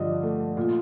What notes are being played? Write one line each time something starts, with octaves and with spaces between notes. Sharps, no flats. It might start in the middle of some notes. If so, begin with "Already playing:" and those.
Already playing: G2 D3 F3 D5 D#5
A3
A#2